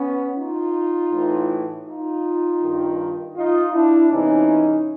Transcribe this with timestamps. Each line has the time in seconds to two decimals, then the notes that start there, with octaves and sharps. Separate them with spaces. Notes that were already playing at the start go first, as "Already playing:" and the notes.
Already playing: B3 C#4
0.36 D#4 F4
1.11 A2 E3
1.86 D#4 F4
2.61 G2 D#3
3.35 D#4 F4
3.73 D4 E4
4.11 E2 C3 E3 C#4 D#4